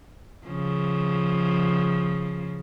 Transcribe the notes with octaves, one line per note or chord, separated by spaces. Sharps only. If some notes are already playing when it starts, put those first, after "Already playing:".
C#3 F3